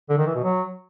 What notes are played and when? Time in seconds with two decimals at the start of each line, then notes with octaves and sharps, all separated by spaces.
0.10 D3
0.18 D#3
0.27 E3
0.35 B2
0.44 F#3